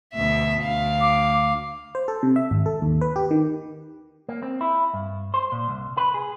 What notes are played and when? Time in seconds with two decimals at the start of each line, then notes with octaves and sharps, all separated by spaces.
0.12 D2 B2 E5
0.60 D2 F5
1.01 D6
1.95 C5
2.08 A4
2.23 C3
2.36 E5
2.51 G#1
2.66 A4
2.82 D#2
3.01 B4
3.16 G4
3.31 D#3
4.29 A#3
4.43 C4
4.61 E4
4.94 G2
5.34 C5
5.52 A#2
5.69 C2
5.97 B4
6.14 G#4